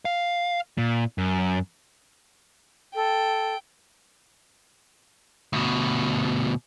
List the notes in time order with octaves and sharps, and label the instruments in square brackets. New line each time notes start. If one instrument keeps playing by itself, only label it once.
[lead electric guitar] F5
A#2
F#2
[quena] A4 [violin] G5
[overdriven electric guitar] D2 B2